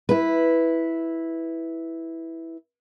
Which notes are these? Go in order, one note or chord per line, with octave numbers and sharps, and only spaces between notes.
E4 B4